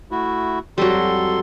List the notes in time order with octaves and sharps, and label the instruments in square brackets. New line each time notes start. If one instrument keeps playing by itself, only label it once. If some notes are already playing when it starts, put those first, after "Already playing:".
[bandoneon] A3 E4 F#4
[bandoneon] F2 A4 C6 [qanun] F#3 G3